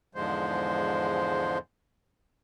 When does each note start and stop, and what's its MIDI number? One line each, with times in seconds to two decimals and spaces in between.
0.15 1.58 40
0.15 1.58 44
0.15 1.58 50
0.15 1.58 53
0.15 1.58 56
0.15 1.58 72